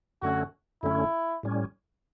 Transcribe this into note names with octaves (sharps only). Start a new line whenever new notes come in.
F#2 D3 A3 C#4 F#4
F#2 D3 A3 C#4 E4
A2 G3 C#4